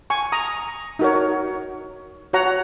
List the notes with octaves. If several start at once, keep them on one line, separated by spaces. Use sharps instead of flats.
G#5 C#6
A#5 D#6
D#4 F#4 A#4 C#5
F#4 C#5 F#5 A#5